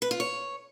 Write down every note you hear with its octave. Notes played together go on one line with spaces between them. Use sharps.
B4
F4
C#5